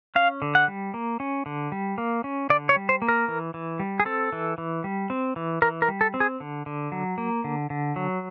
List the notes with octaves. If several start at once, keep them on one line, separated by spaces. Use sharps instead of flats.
C#4 F5
D3
F#5
G3
A#3
C#4
D3
G3
A#3
C#4
D3 D5
C#5
G3
C5
A#3
A#4
E3
E3
G3
G#4
C4 A4
E3
E3
G3
C4
E3
E3 A#4
A#4
G3
A4
C4
G#4
D3
D3
F#3
A#3
D3
D3
F#3